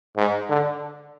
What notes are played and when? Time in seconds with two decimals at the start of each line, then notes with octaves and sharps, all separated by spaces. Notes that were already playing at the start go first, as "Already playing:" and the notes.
0.17 G#2
0.49 D3